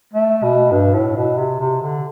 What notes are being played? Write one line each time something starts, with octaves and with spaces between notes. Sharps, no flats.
A3
B2
G2
A2
B2
C3
C3
D3